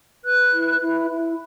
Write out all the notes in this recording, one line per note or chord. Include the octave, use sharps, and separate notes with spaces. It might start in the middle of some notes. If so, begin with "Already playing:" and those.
B4 F#6
E4
E4
E4